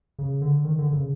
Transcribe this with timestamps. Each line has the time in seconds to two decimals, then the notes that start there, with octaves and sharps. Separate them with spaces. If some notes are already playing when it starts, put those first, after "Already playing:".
0.19 C#3
0.42 D3
0.65 D#3
0.78 D3
0.93 C#3